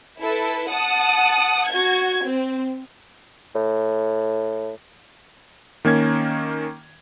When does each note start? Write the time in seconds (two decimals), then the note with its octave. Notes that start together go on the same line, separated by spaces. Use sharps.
0.20 E4 A4 B4
0.69 F#5 A5 D#6
1.68 F#4 G#6
2.24 C4
3.55 A2
5.85 D#3 A#3 C#4 G#6